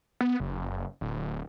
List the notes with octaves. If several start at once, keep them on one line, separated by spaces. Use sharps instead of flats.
B3
F#1
D1